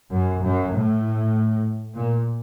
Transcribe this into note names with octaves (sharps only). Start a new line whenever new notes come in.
F#2
F#2
A2
A#2